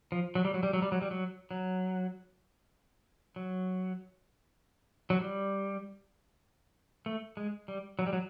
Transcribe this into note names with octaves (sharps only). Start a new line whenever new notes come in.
F3
F#3
G3
F#3
G3
F#3
G3
F#3
G3
F#3
F#3
F#3
F#3
G3
A3
G#3
G3
F#3
G3
F#3